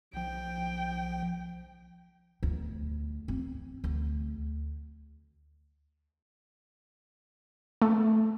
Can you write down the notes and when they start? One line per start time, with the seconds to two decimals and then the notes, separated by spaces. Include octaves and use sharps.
0.13 B1 F3 G5
2.43 D2
3.28 C4
3.84 D2
7.82 A3